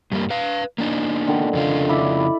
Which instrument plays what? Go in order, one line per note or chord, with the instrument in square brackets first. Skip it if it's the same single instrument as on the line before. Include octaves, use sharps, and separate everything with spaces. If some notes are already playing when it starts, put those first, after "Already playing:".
[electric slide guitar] G2 G3 A#3
B4 F5
A#3 D4 D#4
[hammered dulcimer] D3 D#3
[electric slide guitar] F2 C#3 F4
[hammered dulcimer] E4 D5 B5